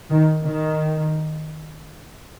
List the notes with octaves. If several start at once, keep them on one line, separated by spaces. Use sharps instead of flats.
D#3
D#3